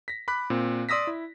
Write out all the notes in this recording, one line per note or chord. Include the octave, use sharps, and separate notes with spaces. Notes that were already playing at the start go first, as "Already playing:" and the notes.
A#6 B6
B5 D6 F#6 B6
A#2 C4
D5 C6 D#6 E6 A#6 B6
E4